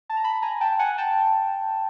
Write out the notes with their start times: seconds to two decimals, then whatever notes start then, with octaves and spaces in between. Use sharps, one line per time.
0.10 A5
0.17 A#5
0.24 A5 B5
0.42 G#5 A#5
0.61 G5 A5
0.79 F#5 G#5
0.98 G5 A5